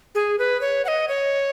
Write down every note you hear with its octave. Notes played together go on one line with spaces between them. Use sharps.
G#4
B4
C#5
F#5
D#5
C#5